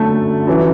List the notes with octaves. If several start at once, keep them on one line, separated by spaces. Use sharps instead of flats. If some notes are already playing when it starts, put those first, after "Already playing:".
Already playing: F#2 D3 A3
F#2 E3